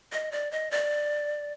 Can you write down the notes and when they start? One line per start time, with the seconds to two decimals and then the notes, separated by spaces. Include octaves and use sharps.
0.12 D#5
0.32 D5
0.51 D#5
0.71 D5